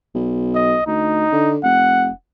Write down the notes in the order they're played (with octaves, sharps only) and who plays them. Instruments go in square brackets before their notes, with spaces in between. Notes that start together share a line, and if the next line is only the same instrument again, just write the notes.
[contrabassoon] B1
[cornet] D#5
[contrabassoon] D2 [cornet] D#4
[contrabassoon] D3
[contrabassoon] F1 [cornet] F#5